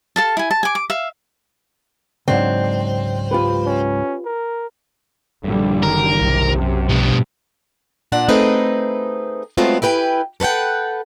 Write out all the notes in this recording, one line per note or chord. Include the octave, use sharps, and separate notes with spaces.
A4 F5 A5
E4 G#5
A5
G#5 D6
D6
E5 F5
C#2 G#2 F#3 C4 D4
F4 G4 B4
C#4
A#4
A#1 G2 D3 G3
F#1 D#3 A#4
B1 C3
F#2
G2 B2 F3
A#2 D4 F#5
A3 C4 D#4 G#4 B4 D#5
F#3 G#3 A3 B3 C4 F4
E4 G4 B4 G5 G#5
A4 B4 C5 F#5 G5